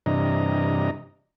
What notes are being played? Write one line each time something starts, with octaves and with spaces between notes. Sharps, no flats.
G2 C3 E3 D4 D#5 A#5